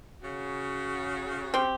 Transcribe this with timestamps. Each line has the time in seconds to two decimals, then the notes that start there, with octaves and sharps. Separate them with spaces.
0.22 C#3 F#4
1.54 C4 G4